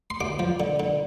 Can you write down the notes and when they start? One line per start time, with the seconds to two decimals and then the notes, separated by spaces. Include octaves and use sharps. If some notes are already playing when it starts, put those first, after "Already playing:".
0.10 C6
0.20 D2 D6
0.39 F3
0.60 D3
0.80 D3